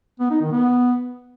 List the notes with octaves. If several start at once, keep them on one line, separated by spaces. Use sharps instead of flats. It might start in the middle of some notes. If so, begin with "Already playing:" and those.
B3
D#4
D#3
B3